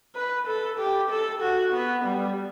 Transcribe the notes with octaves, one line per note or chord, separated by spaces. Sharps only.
B4
A4
G4
A4
F#4
B3
G3